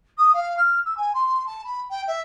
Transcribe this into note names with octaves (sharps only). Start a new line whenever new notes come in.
D#6
F5
F6
E6
G#5
C6
A5
B5
G5
E5